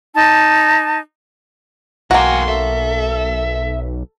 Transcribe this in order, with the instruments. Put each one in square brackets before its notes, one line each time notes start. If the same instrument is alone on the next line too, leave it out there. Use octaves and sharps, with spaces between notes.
[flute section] D#4 A5
[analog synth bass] B1 [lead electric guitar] E2 G5 [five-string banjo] A#3 F#4 [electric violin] G#5 C6
[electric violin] A4 [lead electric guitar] E5